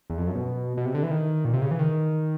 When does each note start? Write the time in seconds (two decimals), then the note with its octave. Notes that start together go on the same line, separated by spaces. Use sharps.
0.10 E2
0.18 F2
0.27 F#2
0.35 B2
0.77 B2
0.85 C3
0.94 D3
1.03 E3
1.11 D#3
1.45 A#2
1.54 C3
1.62 C#3
1.71 E3
1.79 D#3